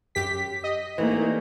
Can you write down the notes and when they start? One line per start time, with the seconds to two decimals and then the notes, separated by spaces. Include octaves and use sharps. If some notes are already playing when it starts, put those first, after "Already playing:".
0.15 F#2 G4 B6
0.64 D#5
0.98 C2 E3 A3 A#3 D#4 F#5